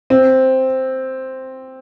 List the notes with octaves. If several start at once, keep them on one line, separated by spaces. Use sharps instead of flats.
C4